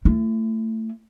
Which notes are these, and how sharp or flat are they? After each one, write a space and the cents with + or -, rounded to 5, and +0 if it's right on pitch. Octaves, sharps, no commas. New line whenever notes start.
A3 +20 E4 +40